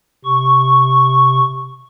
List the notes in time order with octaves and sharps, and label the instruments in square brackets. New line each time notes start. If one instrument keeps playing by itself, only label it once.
[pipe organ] C3 C#6